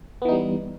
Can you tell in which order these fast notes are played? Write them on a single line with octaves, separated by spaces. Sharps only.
B3 E3 D#4 G3